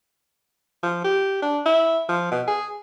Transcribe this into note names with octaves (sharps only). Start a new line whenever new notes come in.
F3
G4
D4
E4
F3
B2
G#4